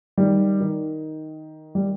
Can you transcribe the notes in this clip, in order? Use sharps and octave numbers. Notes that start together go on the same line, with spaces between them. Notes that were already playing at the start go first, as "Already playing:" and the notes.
D#3 G3
D#3
G3